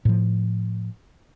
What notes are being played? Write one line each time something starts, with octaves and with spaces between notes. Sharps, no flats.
A2 F3